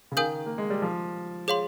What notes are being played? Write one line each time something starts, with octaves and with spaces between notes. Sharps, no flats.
C#3
D#3 A#4 F5 G#5 D#6 G6
A#3
G#3
G3
F3
G#4 C#5 F5 C6